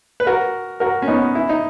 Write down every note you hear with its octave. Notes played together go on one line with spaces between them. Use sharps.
B4
F#4 A#4
F#4 A#4
C#4
B3 D#4
E4
D#4